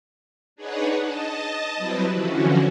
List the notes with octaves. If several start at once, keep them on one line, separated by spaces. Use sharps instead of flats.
D4 D#4 G#4 B4 C#5 F#5
D#5 A5
F#3 G3 C4 E4 B4
D3 E3 F3 C#4 F#4